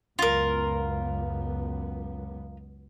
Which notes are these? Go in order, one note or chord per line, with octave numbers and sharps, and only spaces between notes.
C#2 F#2 B3 F4 A#4